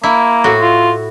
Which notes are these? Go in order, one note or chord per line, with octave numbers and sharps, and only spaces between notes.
A#3 E4
A2 F#4
F4